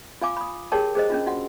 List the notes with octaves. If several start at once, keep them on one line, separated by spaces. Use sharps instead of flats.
F4 F5 G#5 D6
B5 D#6
G4 G#4 A#4 C#5 G5 A5
G#4 C5 D#5
C#4 D4 F4
F4 F#4 F#5